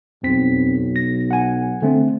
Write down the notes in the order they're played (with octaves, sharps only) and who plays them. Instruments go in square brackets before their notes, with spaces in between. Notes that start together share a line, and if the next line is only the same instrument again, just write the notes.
[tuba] B1 [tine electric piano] F2 C4 B6
[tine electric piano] A#6
F#5 G#5
D3 A3 C4